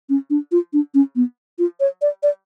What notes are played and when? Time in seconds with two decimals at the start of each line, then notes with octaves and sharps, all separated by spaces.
0.09 C#4
0.30 D4
0.52 F4
0.73 D4
0.94 C#4
1.16 B3
1.59 F4
1.80 C#5
2.02 D5
2.23 D5